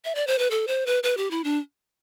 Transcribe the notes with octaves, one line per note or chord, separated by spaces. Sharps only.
E5
D5
C5
B4
A4
C5
B4
B4
G4
E4
D4